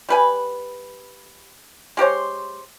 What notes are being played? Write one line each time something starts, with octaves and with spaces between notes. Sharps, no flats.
G3 B4 G#5
G#3 G4 C5 C#5